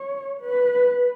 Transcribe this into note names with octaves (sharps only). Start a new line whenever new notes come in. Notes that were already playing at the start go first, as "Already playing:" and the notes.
Already playing: C#5
B4